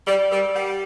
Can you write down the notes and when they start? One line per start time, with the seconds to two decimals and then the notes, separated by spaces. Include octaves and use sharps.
0.07 G3 D5
0.31 G3 A#4
0.55 G3 F#5